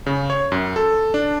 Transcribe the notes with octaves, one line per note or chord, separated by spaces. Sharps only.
C#3
C#5
F#2
A4
D4